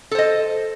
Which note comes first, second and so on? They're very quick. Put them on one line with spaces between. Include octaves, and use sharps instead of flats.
A4 C5 D#5